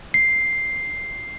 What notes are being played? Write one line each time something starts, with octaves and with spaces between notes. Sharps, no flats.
C7